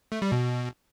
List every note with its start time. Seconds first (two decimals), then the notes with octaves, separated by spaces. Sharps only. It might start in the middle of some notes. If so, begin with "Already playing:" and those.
0.12 A3
0.22 G3
0.32 B2